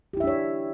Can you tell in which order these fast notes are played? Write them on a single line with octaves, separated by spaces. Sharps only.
G4 E4 E5 D4 C#5